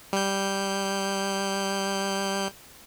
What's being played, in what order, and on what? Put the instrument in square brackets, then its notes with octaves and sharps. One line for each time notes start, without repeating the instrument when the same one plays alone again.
[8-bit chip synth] G3 G6